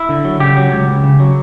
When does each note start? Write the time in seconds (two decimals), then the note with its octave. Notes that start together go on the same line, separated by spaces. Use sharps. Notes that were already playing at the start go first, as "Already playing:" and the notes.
Already playing: E4
0.09 D3
0.25 F#3
0.40 C#3 G4
0.57 F#3
0.72 C#2
0.88 C#2
1.04 C#3
1.20 F#3